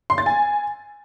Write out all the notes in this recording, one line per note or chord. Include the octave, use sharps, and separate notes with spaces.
C6
A6
G#5